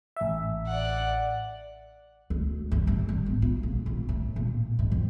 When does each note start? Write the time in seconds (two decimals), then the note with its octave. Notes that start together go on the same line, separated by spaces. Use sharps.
0.17 A1 E5
0.67 D5 F#5
2.30 D2
2.72 G2
2.87 A1
3.09 G3
3.26 B3
3.42 F4
3.63 A#1
3.86 F2
4.09 A2
4.36 A#2
4.79 G#2
4.92 F2